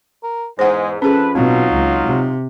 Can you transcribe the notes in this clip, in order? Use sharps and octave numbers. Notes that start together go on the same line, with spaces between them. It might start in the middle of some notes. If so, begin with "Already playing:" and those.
A#4
E2 G#2 G#3 C5 F#5
F2 C#4 G#4 A4 B4
B2 F#3 C4 D#4 F4
C#2
C3